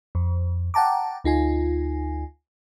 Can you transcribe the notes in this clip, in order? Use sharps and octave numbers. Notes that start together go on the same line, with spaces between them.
F2
F#5 G5 A5 A#5 D6
D2 D#4 F4 G#5